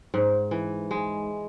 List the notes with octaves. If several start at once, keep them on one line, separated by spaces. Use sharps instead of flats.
G#2
E3
G#3